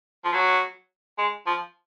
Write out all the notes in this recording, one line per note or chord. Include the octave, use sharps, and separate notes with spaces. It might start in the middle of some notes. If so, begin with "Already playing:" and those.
F3
F#3
G#3
F3